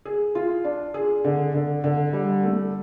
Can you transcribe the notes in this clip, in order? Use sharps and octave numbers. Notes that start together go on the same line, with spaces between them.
G#4
F4
D4
G#4
D3
D3
D3
G3
A3